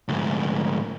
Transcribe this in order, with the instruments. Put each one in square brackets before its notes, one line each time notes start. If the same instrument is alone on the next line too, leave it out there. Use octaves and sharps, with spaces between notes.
[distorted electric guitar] D2 G#2